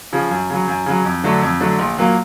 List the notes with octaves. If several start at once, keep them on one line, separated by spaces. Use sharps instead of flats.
C#3 F3
F#2
C#3 F#3
F#2
C#3 F#3
F2
D3 F#3 A3 D4
F2
D3 F#3 A3 D4
A#1
A#2 F#3 A#3